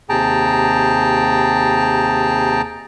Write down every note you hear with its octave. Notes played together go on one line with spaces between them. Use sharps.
D#2 C3 G#4 G5 A5 A#5